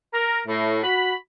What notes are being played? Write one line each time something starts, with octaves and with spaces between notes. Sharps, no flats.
A#4
A2
F#4 B5